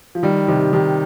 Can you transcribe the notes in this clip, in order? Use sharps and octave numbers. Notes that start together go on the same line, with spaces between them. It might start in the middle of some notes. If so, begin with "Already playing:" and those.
F3
D#3 G3
C3 D#3
C3 D#3